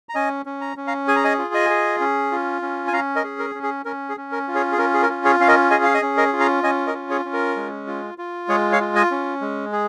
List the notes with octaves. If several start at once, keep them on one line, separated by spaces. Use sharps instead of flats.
A#5
C#4 D#5 G#5
C#4
A#5
C#4
F5 A#5
G#4 G#5
A#5
D#5 G#5
F4
D#5 G#5
G#4
C#4
F4
C#4
G#5
C#4 F5 A#5
A#4 D#5
G#4
A#4
C#4
G#4
C#4 A#4
G#4
C#4
A#4
F4
G#4 C#5
G#4
C#4 A#4
G#4
A#4
F4
G#4 C#5
C#4 F5
A#4 D#5
G#4 D#5 G#5
F5
D#5 G#5
C#4
A#4 D#5
F4
F5 A#5
C#4 D#5 G#5
A#4 D#5
F4
G#4 C#5
C#4
A#4
G#3
F4
F4
G#3 G#4 C#5
C#5 F5
F4
D#5 G#5
C#4
G#3
G#4